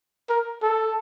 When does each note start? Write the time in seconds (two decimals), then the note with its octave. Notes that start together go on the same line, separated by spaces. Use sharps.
0.29 A#4
0.62 A4